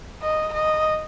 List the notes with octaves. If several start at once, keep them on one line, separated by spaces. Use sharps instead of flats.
D#5
D#5